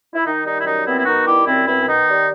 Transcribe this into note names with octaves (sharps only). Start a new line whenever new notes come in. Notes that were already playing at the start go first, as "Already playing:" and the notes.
E4
D#3 D#4
G3 D#4
E4
F#2 D#4
B3 C4 E4
E4
D#3 D#4 F#4
G3 E4 G4
F#2 C4 E4
B3 C4 E4
C4
D#3 D#4
G3